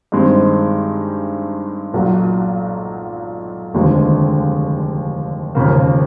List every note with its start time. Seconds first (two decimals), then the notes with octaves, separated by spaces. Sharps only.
0.12 G2 D#3 G#3 C4
1.94 B1 A#2 F#3
3.74 F1 D#2 D3 F3 G#3
5.55 E1 D#2 C#3 F3 A#3